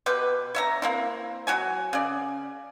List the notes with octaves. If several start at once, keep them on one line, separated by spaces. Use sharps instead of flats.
B2 G4 B4
C#5 E5 A#5
A#3 C4 E4
F#3 F#4 C#5 G#5
C#3 D5